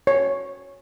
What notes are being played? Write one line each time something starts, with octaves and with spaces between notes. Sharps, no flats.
C#5